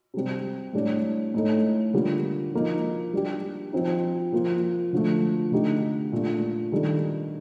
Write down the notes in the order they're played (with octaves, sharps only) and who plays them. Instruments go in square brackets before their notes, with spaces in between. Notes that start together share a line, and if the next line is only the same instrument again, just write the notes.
[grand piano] C3 G3 C4
A2 G3 D4
A2 A3 D#4 A4
D3 G3 A#3 F4
F3 A#3 D#4
G3 D4 G4
F3 C4 D#4
F3 A#3 F4
D3 F3 A3
D3 A3 D#4 G4
A#2 A3 D4
D#3 G3 D4 A4